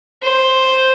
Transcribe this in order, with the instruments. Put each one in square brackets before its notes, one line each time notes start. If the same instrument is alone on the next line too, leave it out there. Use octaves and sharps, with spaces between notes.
[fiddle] C5